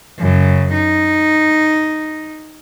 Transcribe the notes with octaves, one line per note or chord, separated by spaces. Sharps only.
F#2 C#3
D#4